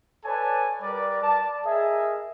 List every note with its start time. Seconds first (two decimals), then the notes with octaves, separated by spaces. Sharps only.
0.24 A4 B4 C#5 D5 G#5 A5
0.82 G3 A#4 B4 D5
1.21 D5 A5
1.65 G#4 A#4 D#5 E5